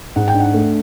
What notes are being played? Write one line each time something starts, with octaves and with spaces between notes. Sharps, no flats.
G#2 F#5
G5
D4
F#5
A3